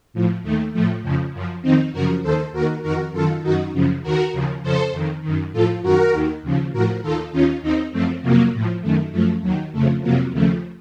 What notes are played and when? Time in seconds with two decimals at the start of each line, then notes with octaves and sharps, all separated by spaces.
0.14 A2 F3
0.43 D#2 D#3 A3
0.73 A2 F3 A3
1.03 F2 C#3 F3
1.34 F#2 F3
1.62 F2 D#3 C4 D#4
1.92 F#2 C#3 F3 F#4 A#4
2.23 D#2 D#3 A4 C5
2.53 D#2 D#3 F#4 A#4
2.83 F2 D#3 F#4 A#4
3.13 F#2 D#3 F4 A4
3.43 F#2 D#3 D#4 F#4
3.73 F#2 C#3 F3
4.03 D#2 D#3 F#4 A#4
4.33 D#2 C#3 F3
4.62 F2 C#3 F3 A4 C5
4.93 F2 D#3
5.22 F#2 D#3
5.53 A2 F3 F4 A4
5.82 F#2 D#3 F#4 A#4
6.13 D#2 D#3
6.43 D#2 C#3 F3
6.73 A2 F3 F#4 A#4
7.02 D#2 D#3 F4 A4
7.32 D#2 D#3 C#4 F4
7.62 D#2 D#3 C4 D#4
7.93 F#2 F3 A3 C4
8.22 F2 C3 F3 F#3 A#3
8.53 A2 F3
8.82 F#2 D#3 A3
9.12 F#2 F3 A3
9.42 D#2 D#3 F#3
9.72 F2 C#3 F3 A3
10.02 F2 C3 F3 F#3 A#3
10.32 D#2 C#3 F3 A3